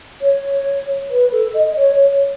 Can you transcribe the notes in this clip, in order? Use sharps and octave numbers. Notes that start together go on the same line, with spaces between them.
C#5
B4
A4
D#5
C#5
C#5